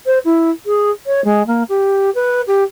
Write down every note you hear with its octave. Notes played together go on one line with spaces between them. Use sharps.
C5
E4
G#4
C#5
G#3
A#3
G4
B4
G4